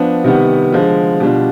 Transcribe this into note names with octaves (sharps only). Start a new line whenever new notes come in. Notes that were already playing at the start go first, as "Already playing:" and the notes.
Already playing: F3 B3 D4
C3 D#3 G3 B3
D3 F3 G#3
B2 G3 D4 F4